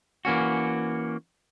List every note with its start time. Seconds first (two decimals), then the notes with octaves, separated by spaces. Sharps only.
0.25 E3 A#3 C#4 F#4